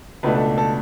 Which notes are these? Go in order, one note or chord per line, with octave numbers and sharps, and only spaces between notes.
C#2 B2 A3 D4 B4
A4
A4